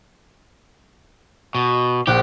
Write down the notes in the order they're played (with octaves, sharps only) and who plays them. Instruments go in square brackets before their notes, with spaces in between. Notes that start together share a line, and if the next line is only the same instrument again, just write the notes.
[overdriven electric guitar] B2
[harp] A#1 F#6 [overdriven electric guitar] G4